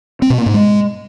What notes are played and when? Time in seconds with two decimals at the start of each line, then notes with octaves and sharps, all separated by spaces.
0.22 C4
0.30 B2
0.38 A#3
0.46 G#2
0.54 G#3